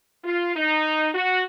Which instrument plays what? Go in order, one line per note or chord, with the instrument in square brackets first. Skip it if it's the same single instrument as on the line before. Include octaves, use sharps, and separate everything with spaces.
[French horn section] F4
D#4
F#4